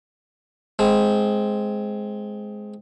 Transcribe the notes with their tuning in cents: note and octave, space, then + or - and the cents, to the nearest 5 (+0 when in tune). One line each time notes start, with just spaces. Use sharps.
G#3 +10 C4 +0